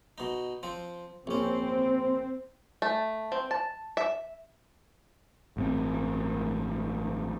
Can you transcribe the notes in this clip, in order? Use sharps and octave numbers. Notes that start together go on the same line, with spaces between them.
B2 D#4
F3 C4
A#1 C4 C#4
A3
C4
A5
E5
A1 G2 C4